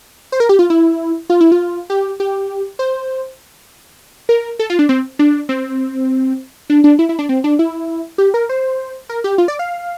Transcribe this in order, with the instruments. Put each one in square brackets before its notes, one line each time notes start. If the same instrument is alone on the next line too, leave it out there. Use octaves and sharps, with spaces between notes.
[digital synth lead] C5
A#4
G4
F4
E4
F4
E4
F4
G4
G4
C5
A#4
A4
F4
D4
C4
D4
C4
D4
D4
E4
E4
D4
C4
D4
E4
G4
A#4
C5
A#4
G4
F4
D5
F5